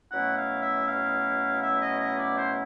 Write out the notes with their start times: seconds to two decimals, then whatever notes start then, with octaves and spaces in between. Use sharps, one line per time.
0.12 B2 F#3 A3 C#4 E4 F#5
0.38 F5
0.63 E5
0.88 F5
1.63 E5
1.82 D#5
2.00 D#5
2.19 D5
2.38 C5